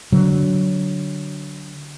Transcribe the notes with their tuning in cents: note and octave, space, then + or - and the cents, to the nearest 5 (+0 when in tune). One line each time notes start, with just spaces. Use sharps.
D3 -15 F#3 +10